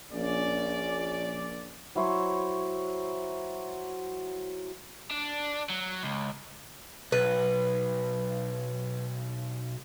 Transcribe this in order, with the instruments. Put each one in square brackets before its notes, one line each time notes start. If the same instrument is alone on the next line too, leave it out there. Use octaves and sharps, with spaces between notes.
[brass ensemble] A#1 C#4 D5
[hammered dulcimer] F#3 E4 C5 C#5
[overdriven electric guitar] D4
F#3
C#2
[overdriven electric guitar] B1 [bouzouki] B4